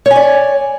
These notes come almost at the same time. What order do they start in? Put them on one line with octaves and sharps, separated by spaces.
C#5 G#5 D5